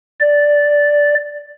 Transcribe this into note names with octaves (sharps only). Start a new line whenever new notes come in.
D5